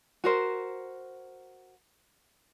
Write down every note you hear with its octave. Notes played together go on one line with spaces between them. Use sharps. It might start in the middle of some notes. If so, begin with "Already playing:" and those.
F#4 A#4 C5